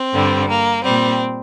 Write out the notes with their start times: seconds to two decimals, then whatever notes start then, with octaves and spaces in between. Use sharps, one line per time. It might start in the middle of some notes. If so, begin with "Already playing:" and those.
Already playing: C4
0.14 G2 D3 G3
0.49 A#3
0.84 A#2 G3 C4